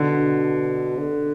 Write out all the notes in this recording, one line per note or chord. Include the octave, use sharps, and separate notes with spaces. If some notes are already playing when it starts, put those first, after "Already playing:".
Already playing: B2 D3
D3